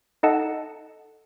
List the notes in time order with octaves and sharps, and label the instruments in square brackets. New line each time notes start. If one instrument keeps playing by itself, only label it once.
[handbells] D#4 A4 D#5 F#5 A5